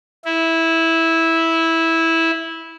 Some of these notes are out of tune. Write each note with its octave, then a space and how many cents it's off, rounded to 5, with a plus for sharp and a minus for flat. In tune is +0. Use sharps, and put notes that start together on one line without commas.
E4 -10